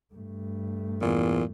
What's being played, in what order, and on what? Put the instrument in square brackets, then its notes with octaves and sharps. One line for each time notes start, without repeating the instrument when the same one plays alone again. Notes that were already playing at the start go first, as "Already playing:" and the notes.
[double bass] G2 A3
[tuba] E2 [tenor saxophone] A#2